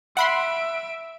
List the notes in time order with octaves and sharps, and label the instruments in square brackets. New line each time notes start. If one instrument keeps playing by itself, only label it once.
[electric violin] E5 D7 [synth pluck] F#5 B5 C6